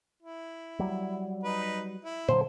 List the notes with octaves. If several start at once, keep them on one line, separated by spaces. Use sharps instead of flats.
E4
F#3 G3
D#4 B4
E4
A#2 D3 F#3 C5